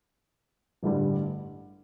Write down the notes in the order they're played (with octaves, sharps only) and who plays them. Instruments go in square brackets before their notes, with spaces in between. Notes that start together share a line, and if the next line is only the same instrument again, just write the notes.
[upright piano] A1 G2 D3 G3